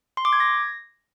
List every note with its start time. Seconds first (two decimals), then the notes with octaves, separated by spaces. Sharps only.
0.17 C6
0.25 D6
0.33 G#6
0.40 A#6